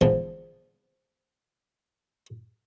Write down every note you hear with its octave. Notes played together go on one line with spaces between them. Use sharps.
G#2 D3 E3 F3 B3